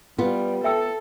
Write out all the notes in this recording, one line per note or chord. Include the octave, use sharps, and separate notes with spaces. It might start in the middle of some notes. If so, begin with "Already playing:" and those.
G3 B3 F4
A4 E5 G5 E6